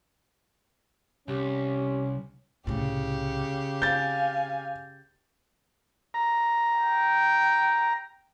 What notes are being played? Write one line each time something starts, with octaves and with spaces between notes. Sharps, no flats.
C2 C#4 G4
C2 A2 C#3 G4
C4 F5 G#5 G6 A6
A#5
G5